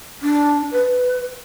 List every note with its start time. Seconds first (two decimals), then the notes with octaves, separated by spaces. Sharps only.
0.22 D4
0.72 B4